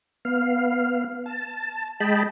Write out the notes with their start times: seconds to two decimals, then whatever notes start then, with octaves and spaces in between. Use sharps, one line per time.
0.25 B3 F5
1.26 A5
2.00 G#3 D#5 G5 A5 B5